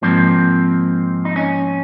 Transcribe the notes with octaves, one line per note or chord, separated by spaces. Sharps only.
G#2 F3 A#3 C4
D#4
C#4